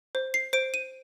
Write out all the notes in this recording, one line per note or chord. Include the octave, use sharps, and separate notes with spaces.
C5
C7
C5 D7
D#7